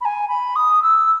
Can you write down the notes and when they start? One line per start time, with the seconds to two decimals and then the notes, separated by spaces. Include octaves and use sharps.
0.01 B5
0.05 G#5
0.28 B5
0.55 D#6
0.82 E6